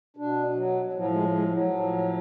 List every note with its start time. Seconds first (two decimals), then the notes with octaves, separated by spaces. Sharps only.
0.17 B2 D4
0.55 F#3
0.93 A2 F3 F#3
1.11 G#3
1.30 G#3
1.50 F#3
1.68 A2 F3